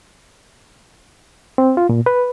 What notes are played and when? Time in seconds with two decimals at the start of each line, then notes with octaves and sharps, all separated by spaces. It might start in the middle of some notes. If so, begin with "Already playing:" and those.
1.58 C4
1.77 F4
1.89 A#2
2.06 B4